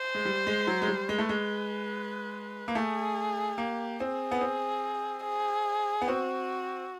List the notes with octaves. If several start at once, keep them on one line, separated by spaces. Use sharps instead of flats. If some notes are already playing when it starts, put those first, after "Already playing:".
Already playing: C5
G#3
G3
G#3
F#3
G#3
G3
G#3 B4
A3
G#3
A#3
A3 G#4
A#3 G4
C4 G#4
B3
C4
G#4
B3
C4 F#4